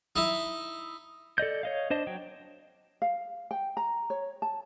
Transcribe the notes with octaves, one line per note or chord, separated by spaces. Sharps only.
D#4 E4
A4 D5 D#5 G6
C#5 D#5 F5
D4 C5 D#5 A5
F#3 G5
F5
G5
A#5
C#5
A5